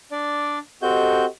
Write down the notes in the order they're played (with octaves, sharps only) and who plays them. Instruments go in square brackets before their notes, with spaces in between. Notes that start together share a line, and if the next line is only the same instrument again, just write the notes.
[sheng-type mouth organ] D4 D5
[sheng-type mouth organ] C4 F#4 G6 [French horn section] G4 A4 D#5